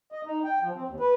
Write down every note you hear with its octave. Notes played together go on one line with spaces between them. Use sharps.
D#5
D#4
G5
F3
C4
D#2
B4